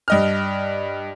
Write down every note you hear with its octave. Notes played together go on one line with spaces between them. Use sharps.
G2 D#5 F6